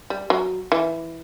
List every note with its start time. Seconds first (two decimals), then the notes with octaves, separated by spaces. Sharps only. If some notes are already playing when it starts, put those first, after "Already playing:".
0.10 G3
0.30 F#3
0.72 E3